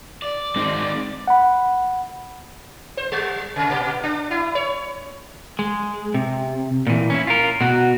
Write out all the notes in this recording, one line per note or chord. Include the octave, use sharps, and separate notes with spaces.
D5
G#3 C4 D#4
F#5 B5
C5
G3
C3
A#2
D4
E4
C#5
G#3
C3
A#2 E3
C#4 E4
F4 A#4
B2 F#4